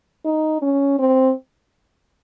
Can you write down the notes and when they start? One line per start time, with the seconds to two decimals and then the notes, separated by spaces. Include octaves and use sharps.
0.25 D#4
0.62 C#4
0.99 C4